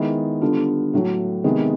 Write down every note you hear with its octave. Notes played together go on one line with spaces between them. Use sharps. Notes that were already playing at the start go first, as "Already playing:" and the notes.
Already playing: D#3 G#3 B3 E4
D3 G3 B3 D4 F4
A2 F#3 A3
C3 D#3 G#3 B3